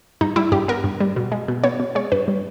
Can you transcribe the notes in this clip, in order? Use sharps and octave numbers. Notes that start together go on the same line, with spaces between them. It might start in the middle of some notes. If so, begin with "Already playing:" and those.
G2 D#4
G3 E4
G2 G4
B3 A#4
G2
G3
B2
G#3
B2
B3 C#5
B2
G#3 C#5
G2 B4
G3